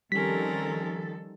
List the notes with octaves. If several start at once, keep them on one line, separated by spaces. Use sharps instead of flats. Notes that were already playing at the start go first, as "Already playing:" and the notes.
D#3 F3 G3 C4 C#4 A4 A#4 B6